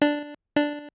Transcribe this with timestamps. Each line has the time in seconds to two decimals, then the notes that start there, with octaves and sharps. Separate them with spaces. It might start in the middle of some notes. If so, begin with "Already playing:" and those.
0.02 D4
0.56 D4